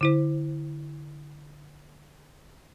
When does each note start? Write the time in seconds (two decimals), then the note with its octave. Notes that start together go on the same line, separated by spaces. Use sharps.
0.01 D3 E4 C5